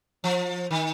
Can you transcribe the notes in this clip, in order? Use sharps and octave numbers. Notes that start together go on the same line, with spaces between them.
F3
D#3